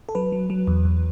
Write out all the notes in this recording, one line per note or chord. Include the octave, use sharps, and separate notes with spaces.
A4
F#3 B4
F#3
F#3
E2
E2